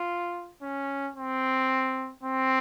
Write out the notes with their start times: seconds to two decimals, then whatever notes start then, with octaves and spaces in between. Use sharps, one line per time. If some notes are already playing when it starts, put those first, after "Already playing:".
Already playing: F4
0.62 C#4
1.16 C4
2.23 C4